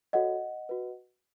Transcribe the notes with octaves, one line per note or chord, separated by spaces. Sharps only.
F#4 A4 C#5 D#5 F#5
F#4 B4